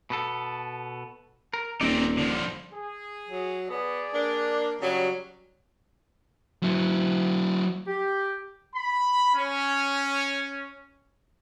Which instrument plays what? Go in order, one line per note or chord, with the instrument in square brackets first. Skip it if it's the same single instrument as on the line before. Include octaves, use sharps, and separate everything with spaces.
[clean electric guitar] B2 B3 A4
A#4
[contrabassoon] D#1 [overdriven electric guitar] C4 D#4 [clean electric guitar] D5
[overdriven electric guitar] D3 F3
[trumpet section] G#4
[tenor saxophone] F#3
[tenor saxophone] B3 [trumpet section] G#4 D5
[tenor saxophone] A#3 [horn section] D4
[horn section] C#3 F#3 [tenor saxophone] G3
[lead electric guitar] F#3 E4
[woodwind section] G4
[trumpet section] B5
C#4